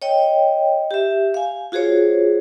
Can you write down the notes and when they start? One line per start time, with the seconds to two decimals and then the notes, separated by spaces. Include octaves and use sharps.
0.02 C#5 D#5 G5
0.91 G4 E5
1.34 F5 G#5
1.72 F4 F#4 G#4 C5 C#5